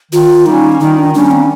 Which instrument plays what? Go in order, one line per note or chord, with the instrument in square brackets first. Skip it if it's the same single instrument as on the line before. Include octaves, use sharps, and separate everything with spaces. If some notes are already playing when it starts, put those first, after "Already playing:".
[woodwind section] D#3 [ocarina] F4
[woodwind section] G3 A#3 C#4 [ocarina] D#4
[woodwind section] D#3 [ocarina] D#4
[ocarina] D4
[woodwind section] G3 A#3 C#4 [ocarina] D4
[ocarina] C4